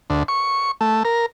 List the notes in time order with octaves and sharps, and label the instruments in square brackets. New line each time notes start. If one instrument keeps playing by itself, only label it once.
[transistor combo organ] D2
C#6
A3
A#4